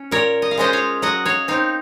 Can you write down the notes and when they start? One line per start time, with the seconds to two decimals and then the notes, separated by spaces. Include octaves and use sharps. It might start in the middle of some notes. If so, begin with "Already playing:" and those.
Already playing: C#4
0.11 A#2 A#4 C#5
0.42 D#5
0.51 F5
0.57 G#3 C#4 F4 C5 D#5
0.73 C#5 F5
1.02 F#3 D#5 F#5
1.25 C#5 F5
1.48 C4 D#4 C#5 F5